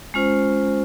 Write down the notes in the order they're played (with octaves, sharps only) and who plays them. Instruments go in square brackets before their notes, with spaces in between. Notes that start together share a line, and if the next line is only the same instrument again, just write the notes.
[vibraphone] G#3 C#4 F4 C5